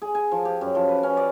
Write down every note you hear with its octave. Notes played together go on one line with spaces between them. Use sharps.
G#4
G#5
F3
G4
F#2
F3
B4
C#4
D5